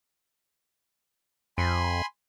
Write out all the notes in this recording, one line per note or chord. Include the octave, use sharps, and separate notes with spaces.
F2 G#5 B5 C6